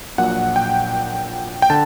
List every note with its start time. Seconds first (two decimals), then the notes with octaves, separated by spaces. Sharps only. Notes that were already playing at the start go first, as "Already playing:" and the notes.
0.18 A#1 A#2 F#3 F#5
0.56 G5
1.62 G5
1.70 D3 A5